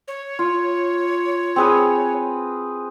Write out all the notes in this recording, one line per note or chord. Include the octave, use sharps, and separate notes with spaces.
C#5
F4
C4 G#4 B4